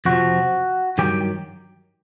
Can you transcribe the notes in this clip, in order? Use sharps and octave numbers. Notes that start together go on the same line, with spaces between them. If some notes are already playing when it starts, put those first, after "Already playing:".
F2 C3 F3 F#4
G2 D#3 F#3 G4